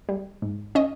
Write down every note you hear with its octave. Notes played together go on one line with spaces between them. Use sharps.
G3
G#2
C#4 D#5